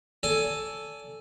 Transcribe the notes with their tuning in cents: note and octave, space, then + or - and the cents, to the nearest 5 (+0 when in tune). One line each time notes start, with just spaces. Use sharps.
A4 +0 D5 -30 G#5 +0